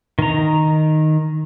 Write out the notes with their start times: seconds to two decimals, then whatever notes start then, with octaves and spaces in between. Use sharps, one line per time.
0.19 D#3 A#5